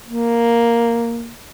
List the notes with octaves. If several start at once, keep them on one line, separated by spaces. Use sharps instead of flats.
A#3